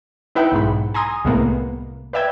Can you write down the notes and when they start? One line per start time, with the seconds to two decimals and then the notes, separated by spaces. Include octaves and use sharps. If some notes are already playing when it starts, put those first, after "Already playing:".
0.35 D#4 E4 B4 E5 F#5 G5
0.52 B1 G#2 B5
0.94 G#5 A#5 C6 D#6
1.25 C2 A2 G#3 A#3 B3
2.13 B4 D5 E5 G5 G#6